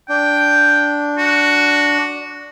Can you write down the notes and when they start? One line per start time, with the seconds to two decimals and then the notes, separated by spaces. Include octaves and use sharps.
0.09 D4 G5
1.18 F#4